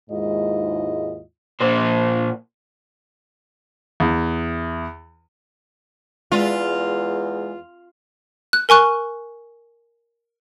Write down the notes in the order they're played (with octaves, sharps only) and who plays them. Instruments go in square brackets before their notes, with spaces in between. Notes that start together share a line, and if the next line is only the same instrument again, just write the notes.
[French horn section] D#2 G#2 G#3 E4 F4 D#5
[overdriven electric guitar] A#2 C5
[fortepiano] E2
[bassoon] E2 [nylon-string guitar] G#3 D5 E5 [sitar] F4
[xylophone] F#6
A#4 G#5 C#6 F#6